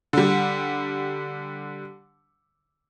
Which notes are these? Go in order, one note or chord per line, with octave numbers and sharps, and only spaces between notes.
D3 G3